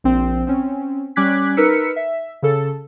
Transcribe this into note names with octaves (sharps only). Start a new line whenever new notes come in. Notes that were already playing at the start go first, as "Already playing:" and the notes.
A#1 C4
C4 C#4
G3 C#4 D6 F#6 G#6 B6
D#4 A#4 B4 E6 B6 C#7
E5
C#3 A4